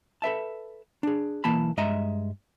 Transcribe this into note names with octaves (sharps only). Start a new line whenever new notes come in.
A4 B4 E5 A5
D4 G#4
B1 E3 A#3 A5 B5
G2 G#3 D#5 E5 A#5